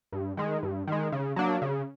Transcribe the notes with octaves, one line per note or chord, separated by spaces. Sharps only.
G2
D#3 G#3
G2
D#3 G#3
C#3
F#3 A#3 D4
C#3